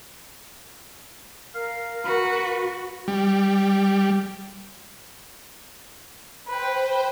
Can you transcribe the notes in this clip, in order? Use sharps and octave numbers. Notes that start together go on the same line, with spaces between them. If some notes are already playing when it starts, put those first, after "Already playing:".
A#4 F5
F#4 B4
G3
B4 C5 G5